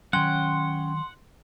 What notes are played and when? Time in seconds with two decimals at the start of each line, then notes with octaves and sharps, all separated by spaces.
0.13 D#3 F#3 C#4 F#5 G5 C6